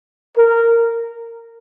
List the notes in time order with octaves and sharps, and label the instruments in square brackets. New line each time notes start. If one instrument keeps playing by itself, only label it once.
[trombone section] A#4